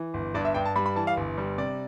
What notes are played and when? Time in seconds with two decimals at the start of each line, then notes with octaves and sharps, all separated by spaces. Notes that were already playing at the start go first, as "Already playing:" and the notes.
Already playing: E3
0.14 G1
0.34 G2 D5
0.45 E5
0.54 G2 G5
0.65 A5
0.76 G3 B5
0.86 B5
0.96 E3 A5
1.07 F5
1.17 G1
1.38 G3
1.58 C3 D5